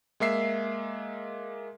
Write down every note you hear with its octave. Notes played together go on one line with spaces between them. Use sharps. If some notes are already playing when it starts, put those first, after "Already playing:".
G#3 A#3 E5 C7